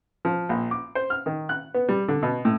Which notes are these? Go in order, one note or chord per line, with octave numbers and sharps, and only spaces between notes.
F3
A#1
D6
C5
F6
D#3
F#6
B3
G3
D3
B2
A2